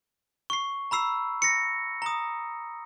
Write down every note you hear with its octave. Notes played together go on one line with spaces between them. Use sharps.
C#6 C7
A#5 B5 E6 C7
A#6 C#7
A#5 D#6